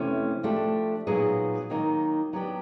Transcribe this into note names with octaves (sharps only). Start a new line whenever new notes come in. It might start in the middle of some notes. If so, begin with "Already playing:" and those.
Already playing: F2 C3 E3 A3 C#4
F3 A3 D4 G4
A#2 F#3 B3 D#4 G#4
D#3 F#3 A#3 D#4
F#3 B3 D4 G4